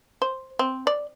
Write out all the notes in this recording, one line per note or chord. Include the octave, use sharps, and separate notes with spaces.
C5
C4
D5